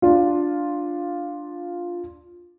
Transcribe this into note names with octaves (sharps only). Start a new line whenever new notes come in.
D4 F4